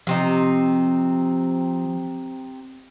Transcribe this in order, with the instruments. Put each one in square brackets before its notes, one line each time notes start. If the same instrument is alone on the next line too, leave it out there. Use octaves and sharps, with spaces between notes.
[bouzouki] C3 C4 D#4 [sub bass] F3